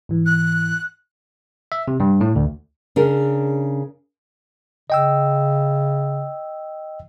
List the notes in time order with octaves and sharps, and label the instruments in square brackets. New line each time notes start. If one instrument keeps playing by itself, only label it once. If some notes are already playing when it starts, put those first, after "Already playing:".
[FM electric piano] G#2 E3
[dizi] F#6
[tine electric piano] E5
C3
G2
A2
D2
[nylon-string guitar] C#3 D4 A#4
[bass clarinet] C#3 [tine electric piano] D#5 G5 E6